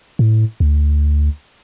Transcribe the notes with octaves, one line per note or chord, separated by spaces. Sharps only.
A2
D2